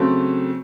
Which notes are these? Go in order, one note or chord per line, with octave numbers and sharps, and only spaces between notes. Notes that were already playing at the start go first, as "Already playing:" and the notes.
Already playing: C#3 F#3 A3 C4